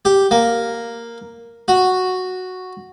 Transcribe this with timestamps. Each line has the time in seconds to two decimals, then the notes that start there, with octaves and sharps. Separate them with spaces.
0.05 G4
0.31 A#3
1.68 F#4